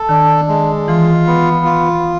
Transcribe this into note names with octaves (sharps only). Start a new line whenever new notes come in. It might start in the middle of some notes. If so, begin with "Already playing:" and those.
Already playing: A4
D#3 D4
G#3
E3 F4
B3
F4